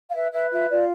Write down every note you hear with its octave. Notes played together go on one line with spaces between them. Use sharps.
F5
B4 E5
B4 E5
F4 E5
F4 D5